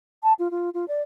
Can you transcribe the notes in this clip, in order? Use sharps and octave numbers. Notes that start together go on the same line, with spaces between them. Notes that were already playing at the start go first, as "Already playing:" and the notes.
A5
F4
F4
F4
D5